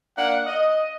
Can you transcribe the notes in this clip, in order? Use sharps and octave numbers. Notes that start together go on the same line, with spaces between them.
A#3 D4 F#5
D#5